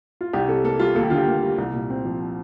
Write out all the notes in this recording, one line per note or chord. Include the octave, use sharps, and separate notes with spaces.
F4
C2 G4
C3 A4
A#3 A4
G3 F4
D#2 A4
G4
D3 F4
G4
A#3
G3
C2
A#2
C4
F3